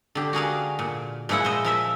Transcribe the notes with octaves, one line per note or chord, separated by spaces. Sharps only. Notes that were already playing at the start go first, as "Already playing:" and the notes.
D3 G4
F#4 G#4 A#4 F5
A#2
A#2 F3 G#3 E4 F#5
C5 D#5
F3 A#4 E5